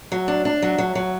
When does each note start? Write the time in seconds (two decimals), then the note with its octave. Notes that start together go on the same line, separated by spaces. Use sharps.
0.12 F#3
0.28 D4
0.45 D4
0.62 F#3
0.78 F#3
0.95 F#3